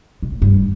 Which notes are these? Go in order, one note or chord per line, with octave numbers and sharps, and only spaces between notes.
B2
A2
G2